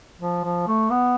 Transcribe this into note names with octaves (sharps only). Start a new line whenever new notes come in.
F3
F3
A3
B3